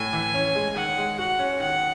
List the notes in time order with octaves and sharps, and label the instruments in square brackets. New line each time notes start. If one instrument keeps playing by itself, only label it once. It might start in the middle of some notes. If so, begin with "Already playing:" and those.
Already playing: [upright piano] A2 [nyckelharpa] G#5
[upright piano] E3
C#4
G#3
[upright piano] D#3 [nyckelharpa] F#5
[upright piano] G#3
[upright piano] F#4 [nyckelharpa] F#5
[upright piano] C#4
[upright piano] D#3 [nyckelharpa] F#5